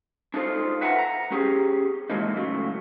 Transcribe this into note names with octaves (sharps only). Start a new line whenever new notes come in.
D4 D#4 F4 A4 C5
B4 E5 F#5 A5 A#5
A#5
C#4 G4 G#4
A#2 E3 F#3 G#3 A#3 D#4
C#3 F#3 A3